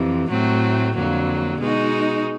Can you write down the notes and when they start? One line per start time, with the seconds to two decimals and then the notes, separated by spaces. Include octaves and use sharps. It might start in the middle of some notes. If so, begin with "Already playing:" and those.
Already playing: F2 C3 E3
0.29 A2 F#3 A3 C4
0.94 F2 D3 F#3 A#3
1.58 B2 G#3 B3 D#4 F#4